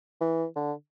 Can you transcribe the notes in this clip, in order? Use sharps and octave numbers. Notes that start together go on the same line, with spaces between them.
E3
D3